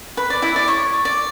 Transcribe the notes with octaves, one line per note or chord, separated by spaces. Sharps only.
B4
D5
E4 E5
D5
C#5
D5